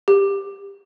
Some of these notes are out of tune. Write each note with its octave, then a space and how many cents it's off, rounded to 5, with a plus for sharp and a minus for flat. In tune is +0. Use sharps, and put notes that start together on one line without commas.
G4 +20